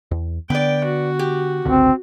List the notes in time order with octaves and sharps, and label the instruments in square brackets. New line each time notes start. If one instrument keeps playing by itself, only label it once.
[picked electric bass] E2
[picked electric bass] D3 B3 [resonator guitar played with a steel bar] B4 D5 [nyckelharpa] G5
[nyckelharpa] F#4
[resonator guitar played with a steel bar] G4
[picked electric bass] G1 C#2 D3 [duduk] C4